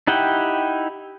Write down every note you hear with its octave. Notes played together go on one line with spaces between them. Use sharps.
D#4 E4 G4 F#5 G5